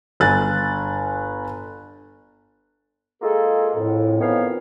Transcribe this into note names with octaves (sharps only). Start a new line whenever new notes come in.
G1 G#5 F#6 A6
G#3 A#3 F4 G#4 A4
F2 A2
F2 D#3 E3 B3 C#5 F5